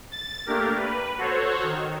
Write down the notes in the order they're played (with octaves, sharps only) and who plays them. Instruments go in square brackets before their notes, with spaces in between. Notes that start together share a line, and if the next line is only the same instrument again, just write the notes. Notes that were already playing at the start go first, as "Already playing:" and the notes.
[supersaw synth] A6
A3 A#3 D4 G4 A#4
B4
F#4 A4 C5 C#5
D#3